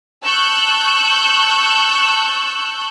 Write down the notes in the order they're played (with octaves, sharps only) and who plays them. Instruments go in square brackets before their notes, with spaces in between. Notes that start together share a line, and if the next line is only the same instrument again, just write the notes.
[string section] A5 C#6 E6 F#6 G6